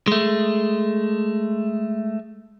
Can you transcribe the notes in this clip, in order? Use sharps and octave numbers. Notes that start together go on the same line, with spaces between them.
G#3 A3